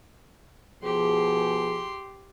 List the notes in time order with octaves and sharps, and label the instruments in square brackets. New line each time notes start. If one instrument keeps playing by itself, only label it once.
[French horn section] B2 F3 G#4 [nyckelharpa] G4 C6